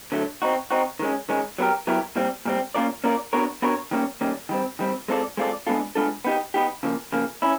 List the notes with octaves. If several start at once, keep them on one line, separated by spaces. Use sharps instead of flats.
D3 F#3 A3
C4 D#4 F#4
C4 D#4 F#4
D#3 G#3 C#4
D#3 G#3 C#4
F#3 B3 E4 G4 A#4
F#3 B3 E4 G4 A#4
A#2 G3 C4
A#2 G3 C4
A#3 C#4 F4 A#4 D5
A#3 C#4 F4 A#4 D5
B3 D4 F#4 A#4 C#5
B3 D4 F#4 A#4 C#5
D#3 G3 A#3 C#4
D#3 G3 A#3 C#4
D#3 G3 C4
D#3 G3 C4
G#3 C4 F4 A4 D5
G#3 C4 F4 A4 D5
G#3 B3 D4 F4 A4
G#3 B3 D4 F4 A4
B3 D#4 G4
B3 D#4 G4
C#3 F3 A#3
C#3 F3 A#3
C#4 E4